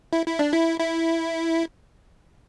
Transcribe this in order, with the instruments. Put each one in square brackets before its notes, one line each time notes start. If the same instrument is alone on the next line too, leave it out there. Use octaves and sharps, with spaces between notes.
[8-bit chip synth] E4
E4
D4
E4
E4